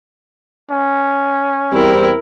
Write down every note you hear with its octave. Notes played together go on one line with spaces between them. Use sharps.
C#4
E2 G3 C4 E4 A#4